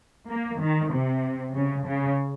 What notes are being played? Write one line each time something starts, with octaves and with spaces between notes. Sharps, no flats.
A#3
D#3
C3
C#3
C#3